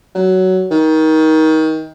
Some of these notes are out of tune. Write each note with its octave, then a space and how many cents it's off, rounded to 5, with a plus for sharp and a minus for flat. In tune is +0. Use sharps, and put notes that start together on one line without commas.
F#3 +10
D#3 +25